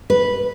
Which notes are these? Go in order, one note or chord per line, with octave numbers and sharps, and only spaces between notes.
B4